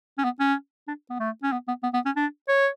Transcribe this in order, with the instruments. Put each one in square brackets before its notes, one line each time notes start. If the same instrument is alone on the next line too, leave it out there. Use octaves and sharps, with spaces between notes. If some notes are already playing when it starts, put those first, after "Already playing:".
[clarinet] C#4
B3
C#4
D4
B3
A3
C#4
B3
B3
B3
B3
C#4
D4
C#5